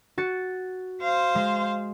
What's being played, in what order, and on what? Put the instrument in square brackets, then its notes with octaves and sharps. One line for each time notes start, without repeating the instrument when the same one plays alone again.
[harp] F#4 A6 C#7
[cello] C5 F5
[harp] G#3